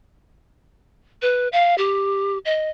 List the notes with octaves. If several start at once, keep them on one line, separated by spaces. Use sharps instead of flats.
B4
F5
G4
D#5